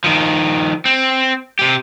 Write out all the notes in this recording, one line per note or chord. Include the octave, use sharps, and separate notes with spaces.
D#3 F3
C4
C3 G4